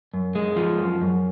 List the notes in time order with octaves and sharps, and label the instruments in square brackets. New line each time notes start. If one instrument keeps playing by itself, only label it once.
[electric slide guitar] F#2
G#3
F3
F#2
F#2